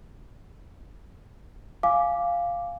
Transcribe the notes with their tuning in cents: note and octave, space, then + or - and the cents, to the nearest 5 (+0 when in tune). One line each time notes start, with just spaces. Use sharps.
F5 +0 G#5 +0 D6 +0